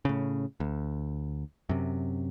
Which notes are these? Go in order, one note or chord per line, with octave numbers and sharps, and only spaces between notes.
A2 C#3
D2
F#2 C3